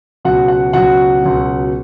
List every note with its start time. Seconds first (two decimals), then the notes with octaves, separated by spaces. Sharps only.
0.25 C#2 B2 F#3 F#5
0.48 F#5
0.73 C#2 B2 F#3 F#5
1.22 C#2 B2 F#3